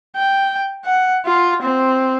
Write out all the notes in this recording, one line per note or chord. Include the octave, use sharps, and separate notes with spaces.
G5
F#5
F4
C4